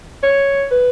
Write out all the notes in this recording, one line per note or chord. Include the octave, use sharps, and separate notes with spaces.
C#5
B4